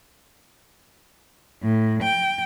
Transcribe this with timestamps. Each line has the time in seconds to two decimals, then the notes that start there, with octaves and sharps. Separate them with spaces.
1.62 A2
2.03 G5